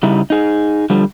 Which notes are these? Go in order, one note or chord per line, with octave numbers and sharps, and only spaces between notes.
C#3 G3 D#4 E4
D#4 G#4
D3 F3 G3